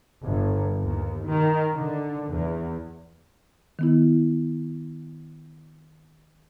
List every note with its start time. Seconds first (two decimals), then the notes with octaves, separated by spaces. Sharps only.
0.24 G1
0.82 D#2
1.27 D#3
1.74 D3
2.29 E2
3.79 D#3 B3 E4